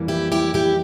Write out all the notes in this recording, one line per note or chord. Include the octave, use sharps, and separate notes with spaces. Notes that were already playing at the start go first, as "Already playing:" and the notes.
Already playing: F2 E3 G3 A#3
E4 G4
E4 G4
E4 G4